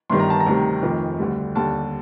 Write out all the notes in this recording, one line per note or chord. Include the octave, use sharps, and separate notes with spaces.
G1 G2 D#3 G3 C6
A#5
A5
A#5
D2 C3 D#3 G3
F1 F2 D#3
D2 D3 G3
D#2 D3 G3 A5